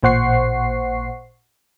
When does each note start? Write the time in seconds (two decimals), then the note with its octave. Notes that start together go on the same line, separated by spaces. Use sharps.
0.03 A1 A#2 C5 F#5 C#6 C7